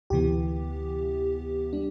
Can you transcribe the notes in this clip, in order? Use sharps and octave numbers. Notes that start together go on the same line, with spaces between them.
D2 C3 E3 B3 G4
G3 D4